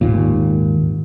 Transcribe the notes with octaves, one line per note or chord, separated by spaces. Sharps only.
G#1 D#2 A#2